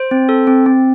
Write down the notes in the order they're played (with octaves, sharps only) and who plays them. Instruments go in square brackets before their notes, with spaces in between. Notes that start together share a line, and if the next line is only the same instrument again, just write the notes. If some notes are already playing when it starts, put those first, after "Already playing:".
Already playing: [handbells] C5
C4
A4
C4
C4